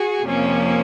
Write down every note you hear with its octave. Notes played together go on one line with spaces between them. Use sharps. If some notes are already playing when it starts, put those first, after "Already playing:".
Already playing: F#4 G#4
F2 C3 F3 A#3 C#4